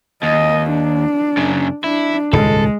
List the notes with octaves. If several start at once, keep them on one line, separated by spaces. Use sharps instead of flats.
D#2 D#5
D4
F#2 C#3
D4 E4
D#1 C#2 G#2 G#3 A4